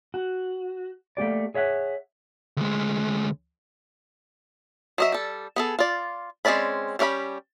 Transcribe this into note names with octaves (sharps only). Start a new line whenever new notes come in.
F#4
A3 A#3 G4 D5
G#4 C#5 E5 F#5
D2 G#3
F#3 D#5 E5
G3 A4
B3 G#4 A4
F4 D5
G#3 C4 C#4 D5 B5
G3 C#4 G4 F5 B5